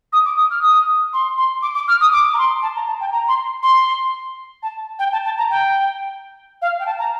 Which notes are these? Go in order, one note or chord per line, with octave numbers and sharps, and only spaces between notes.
D#6
D6
D#6
F6
D#6
C6
C6
D6
D6
F6
D#6
D6
A#5
C6
A5
A#5
A5
G5
A#5
C6
C6
A5
G5
A5
A5
A#5
G5
F5
G5
A5
A#5